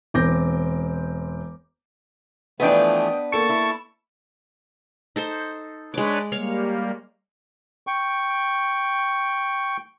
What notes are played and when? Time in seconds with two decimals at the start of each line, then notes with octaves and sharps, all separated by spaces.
0.14 E1 C4 D6 G6 A#6
2.60 E3 F3 A3 B3 D4 B4 D#5 G5
3.32 A#3 A4 A5 C#6 C#7
3.49 E4
5.16 D#4 A4 C5
5.94 G#3 D4 B4 C#5 D6
6.32 G3 A#3 C#5 F5
7.87 G5 C#6